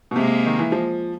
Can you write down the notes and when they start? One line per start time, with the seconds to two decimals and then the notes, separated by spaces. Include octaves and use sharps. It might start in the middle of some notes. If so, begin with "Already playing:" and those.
0.11 B2
0.16 C3 G#3 A#3
0.46 D#3
0.59 E3
0.72 F3